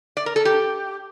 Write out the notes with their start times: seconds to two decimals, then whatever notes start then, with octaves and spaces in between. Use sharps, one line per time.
0.17 D5
0.26 A#4
0.36 A4
0.45 G4